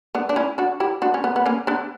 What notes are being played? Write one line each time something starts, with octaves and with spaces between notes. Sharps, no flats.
B3 D4
D4
C#4 E4
D4 F#4
E4 G4
D4 F#4
C#4
B3
B3
A#3 C#4
B3 D4